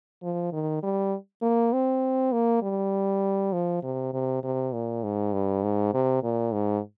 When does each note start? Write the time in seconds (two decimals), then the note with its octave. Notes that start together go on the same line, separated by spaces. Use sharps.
0.23 F3
0.52 D#3
0.83 G3
1.42 A#3
1.73 C4
2.32 A#3
2.62 G3
3.53 F3
3.83 C3
4.13 C3
4.43 C3
4.73 A#2
5.04 G#2
5.33 G2
5.63 G#2
5.94 C3
6.23 A#2
6.53 G#2